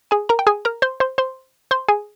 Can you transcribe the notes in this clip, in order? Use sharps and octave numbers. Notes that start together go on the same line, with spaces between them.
G#4 G#5
A#4 A#5
G5
G#4 G#5
A#4 A#5
C5 C6
C5 C6
C5 C6
C5 C6
G#4 G#5